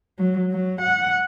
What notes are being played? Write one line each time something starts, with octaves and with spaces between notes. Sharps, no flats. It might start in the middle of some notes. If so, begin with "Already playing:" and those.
F#3
F#3
F#5